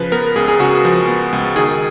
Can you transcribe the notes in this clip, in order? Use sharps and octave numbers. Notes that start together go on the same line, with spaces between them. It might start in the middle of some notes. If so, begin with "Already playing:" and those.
Already playing: C#3 F3 B4
B3 A#4
C#2 G#4
G#4
C#3 F#4
F3
B3
C#2
D#3 G#4